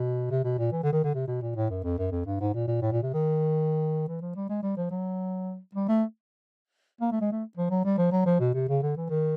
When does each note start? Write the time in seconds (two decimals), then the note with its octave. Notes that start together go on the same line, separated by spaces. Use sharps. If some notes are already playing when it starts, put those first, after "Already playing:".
Already playing: B2
0.31 C3
0.44 B2
0.59 A#2
0.72 E3
0.83 D3
0.93 D#3
1.04 D3
1.15 C3
1.28 B2
1.42 A#2
1.56 A2
1.70 F#2
1.84 F2
1.98 F#2
2.11 F2
2.26 G2
2.40 G#2
2.54 A#2
2.67 A#2
2.82 A2
2.92 A#2
3.03 C3
3.14 D#3
4.08 E3
4.21 F3
4.36 G3
4.49 G#3
4.63 G3
4.77 F3
4.91 F#3
5.75 G3
5.89 A3
7.01 A#3
7.12 A3
7.21 G#3
7.32 A3
7.57 F3
7.71 F#3
7.85 G3
7.98 F3
8.12 F#3
8.26 F3
8.40 B2
8.54 C3
8.69 C#3
8.82 D3
8.97 E3
9.10 D#3